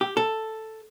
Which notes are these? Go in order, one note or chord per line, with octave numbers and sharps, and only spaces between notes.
G4
A4